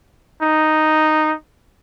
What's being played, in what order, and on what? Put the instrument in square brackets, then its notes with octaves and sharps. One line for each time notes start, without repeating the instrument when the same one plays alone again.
[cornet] D#4